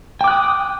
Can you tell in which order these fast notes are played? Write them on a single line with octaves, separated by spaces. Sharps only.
G5 D6 F#6 D#6